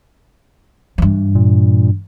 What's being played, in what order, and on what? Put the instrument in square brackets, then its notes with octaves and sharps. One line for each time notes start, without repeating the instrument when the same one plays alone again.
[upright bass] G2 E3
[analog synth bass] A#2